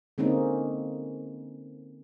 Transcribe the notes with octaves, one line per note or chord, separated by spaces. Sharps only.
D3 G#3 A#3 C4 C#4 D#4